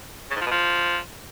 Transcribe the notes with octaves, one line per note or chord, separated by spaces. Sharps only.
C#3
G#2
F3
B2
F3